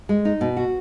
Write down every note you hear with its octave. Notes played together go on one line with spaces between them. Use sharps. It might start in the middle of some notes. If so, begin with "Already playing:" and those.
G#3
D#4
B2
F#4